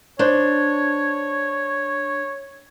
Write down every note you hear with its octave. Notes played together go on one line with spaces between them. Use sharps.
D4 C5 C#5